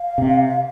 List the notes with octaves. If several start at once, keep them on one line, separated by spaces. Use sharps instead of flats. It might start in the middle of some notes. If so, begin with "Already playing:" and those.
Already playing: F5
C3